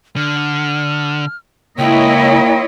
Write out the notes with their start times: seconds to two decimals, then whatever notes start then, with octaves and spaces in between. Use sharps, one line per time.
0.16 D3 F6
1.79 C#2 A#3 E4 C#5 D#5 G5